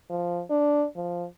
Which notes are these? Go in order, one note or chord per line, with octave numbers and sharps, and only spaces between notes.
F3
D4
F3